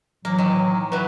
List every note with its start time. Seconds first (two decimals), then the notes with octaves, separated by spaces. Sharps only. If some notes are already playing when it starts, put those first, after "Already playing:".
0.25 A2 E3 F#3 A#3
0.38 D#3
0.92 E3 F#3 B4